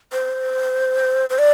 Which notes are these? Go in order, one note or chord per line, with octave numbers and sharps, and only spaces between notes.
C5
C5
D5